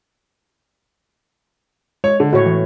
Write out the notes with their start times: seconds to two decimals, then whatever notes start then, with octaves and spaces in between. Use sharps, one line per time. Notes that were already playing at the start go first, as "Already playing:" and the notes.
2.04 G#3 C#5
2.20 D3
2.33 A2 F#4 C#5
2.46 E3